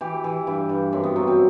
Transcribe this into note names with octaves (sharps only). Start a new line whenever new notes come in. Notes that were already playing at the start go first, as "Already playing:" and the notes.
E3 G4
E3
G2 E4
G2
F#2 C4
B3
F#3 C4
C4